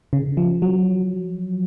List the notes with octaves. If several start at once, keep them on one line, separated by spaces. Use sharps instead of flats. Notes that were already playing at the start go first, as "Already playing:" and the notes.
C#3
F3
F#3